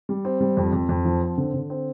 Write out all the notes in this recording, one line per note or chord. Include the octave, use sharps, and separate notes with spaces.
G3
C4
G3
F2
F2
F2
F3
C4
D3
D3
C4